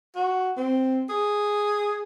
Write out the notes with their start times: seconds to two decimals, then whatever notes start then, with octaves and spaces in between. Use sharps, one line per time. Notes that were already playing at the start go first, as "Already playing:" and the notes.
0.16 F#4
0.57 C4
1.09 G#4